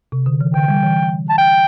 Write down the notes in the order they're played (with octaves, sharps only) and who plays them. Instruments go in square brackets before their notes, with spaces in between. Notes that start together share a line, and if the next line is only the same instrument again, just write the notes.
[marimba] C3
D3
E3
[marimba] D3 [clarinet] G5
[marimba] G3
E3
[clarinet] A5
G5